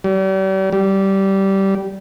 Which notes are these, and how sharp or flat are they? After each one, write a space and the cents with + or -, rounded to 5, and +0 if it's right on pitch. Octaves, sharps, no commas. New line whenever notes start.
G3 -40
G3 -15